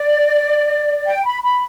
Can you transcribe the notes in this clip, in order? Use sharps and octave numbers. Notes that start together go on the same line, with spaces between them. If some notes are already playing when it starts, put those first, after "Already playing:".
Already playing: D5
G5
B5
B5